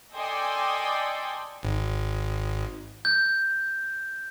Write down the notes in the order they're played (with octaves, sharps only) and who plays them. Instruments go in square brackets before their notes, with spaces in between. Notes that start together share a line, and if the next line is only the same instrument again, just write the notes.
[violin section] A4 D5 D#5 G5 G#5 C6
[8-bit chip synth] G#1
[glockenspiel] G6